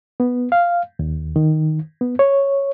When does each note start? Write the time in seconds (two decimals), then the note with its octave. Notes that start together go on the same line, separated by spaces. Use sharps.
0.20 B3
0.52 F5
0.99 D#2
1.36 D#3
2.01 B3
2.19 C#5